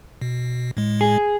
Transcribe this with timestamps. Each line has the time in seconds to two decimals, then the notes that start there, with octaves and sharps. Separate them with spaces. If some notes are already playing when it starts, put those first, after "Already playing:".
0.21 B2
0.77 A2 G#3
1.01 G#4